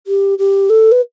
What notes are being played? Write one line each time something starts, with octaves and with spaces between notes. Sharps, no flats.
G4
G4
A4
B4